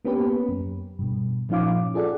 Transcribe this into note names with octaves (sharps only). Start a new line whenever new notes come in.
A#3 B3 C#4 G4 B4
F#2
G2 B2
A#2 F3 C#4 D#4 F5 D6
F4 G#4 A4 D5 F#5